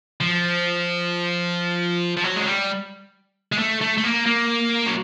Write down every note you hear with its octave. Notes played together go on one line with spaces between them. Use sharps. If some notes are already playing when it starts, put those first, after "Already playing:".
F3
F3
F#3
G#3
G3
G#3
A3
A3
A3
A#3
A#3
F#3